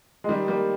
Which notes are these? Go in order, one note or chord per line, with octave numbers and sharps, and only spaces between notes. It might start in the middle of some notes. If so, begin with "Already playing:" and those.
G#3
D#3 G3
G3 A#3